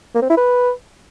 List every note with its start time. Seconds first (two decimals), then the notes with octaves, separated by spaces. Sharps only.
0.15 A#3
0.22 C4
0.30 E4
0.37 B4